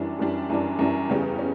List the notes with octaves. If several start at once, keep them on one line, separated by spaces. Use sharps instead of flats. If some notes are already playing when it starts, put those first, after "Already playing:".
Already playing: F#2 E3 G3 D4
F#2 E3 G3 D4
F#2 E3 G3 D4
F#2 E3 G3 D4
E2 C#3 G3 C#4
C#4